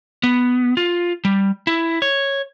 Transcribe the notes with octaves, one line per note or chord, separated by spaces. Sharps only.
B3
F4
G3
E4
C#5